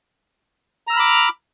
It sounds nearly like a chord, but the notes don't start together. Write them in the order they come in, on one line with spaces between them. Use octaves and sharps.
A#5 E6 F6 B5 D6